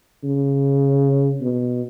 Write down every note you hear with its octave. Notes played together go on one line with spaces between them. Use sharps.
C#3
B2